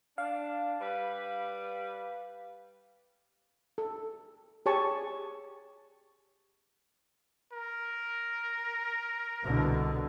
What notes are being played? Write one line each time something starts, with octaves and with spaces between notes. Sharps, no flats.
D4 F5
G3 B4
A4
G4 G#4 C#5 G#5 A5 C#6
A#4
C2 B2 D3